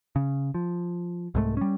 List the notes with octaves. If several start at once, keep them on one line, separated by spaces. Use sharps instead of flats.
C#3
F3
C2 G#2 A3
G3 C#4